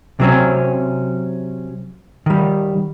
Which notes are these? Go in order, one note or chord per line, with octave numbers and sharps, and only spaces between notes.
C3 F#3 C4 C#4
D#3 G3